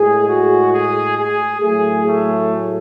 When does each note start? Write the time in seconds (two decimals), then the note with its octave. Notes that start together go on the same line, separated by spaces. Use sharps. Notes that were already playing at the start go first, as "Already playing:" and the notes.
Already playing: A2 G#3 G#4
0.28 F#4
0.72 G#4
1.17 G#4
1.61 A2 F#3 A3 G#4
2.06 A3